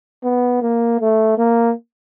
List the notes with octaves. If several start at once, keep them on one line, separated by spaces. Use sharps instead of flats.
B3
A#3
A3
A#3